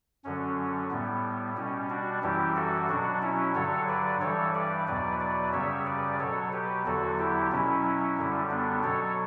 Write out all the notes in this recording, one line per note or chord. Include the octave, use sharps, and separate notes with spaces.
F#2 D3 F#3 C#4
A2 G3 B3
B2 G3 C#4
D4 F#4
F#2 E3 G3 E4 G4
F#4 A4
B2 F#3 D4 F#4
C#4 E4
G2 D3 F#3 A4 C#5
B4 D5
G2 E3 G3 A4 C#5
B4 D5
E2 B2 F#3 B4 D5
B4 D5
F#2 C#3 G3 C#5 E5
B4 D5
B2 F#3 A4 C#5
G4 B4
E2 D3 F#3 F#4 A4
E4 G4
B2 F#3 C#4 E4
F#2 D3 G3
B3 D4
B2 F#3 A4 C#5